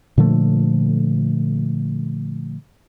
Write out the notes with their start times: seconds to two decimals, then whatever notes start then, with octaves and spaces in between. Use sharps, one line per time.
0.18 A#2 D3 F3 A3